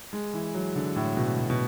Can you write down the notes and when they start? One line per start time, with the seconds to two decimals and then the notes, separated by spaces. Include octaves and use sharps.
0.13 G#3
0.33 E3
0.55 F#3
0.76 D3
0.96 A2
1.17 B2
1.38 B2
1.50 B2